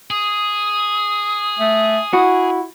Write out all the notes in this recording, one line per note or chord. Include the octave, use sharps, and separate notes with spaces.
G#4 D#6
A3
E4 F#4